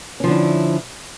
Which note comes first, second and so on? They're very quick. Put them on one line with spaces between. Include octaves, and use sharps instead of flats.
C#4 F3 D3 E4